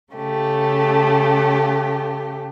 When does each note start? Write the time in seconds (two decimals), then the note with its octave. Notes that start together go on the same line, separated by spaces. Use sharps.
0.13 C#3 A3 G4